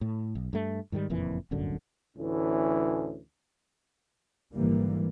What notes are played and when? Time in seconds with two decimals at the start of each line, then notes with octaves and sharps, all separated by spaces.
0.01 A2
0.35 B1
0.53 G2 A3
0.92 G#2 D#3 F#3 G3
1.10 F#1 F2 A#2 E3
1.51 D1 G1 F#2 D3
2.17 D2 A2 E3 C#4
4.53 G#1 D3 E3 G3 A#3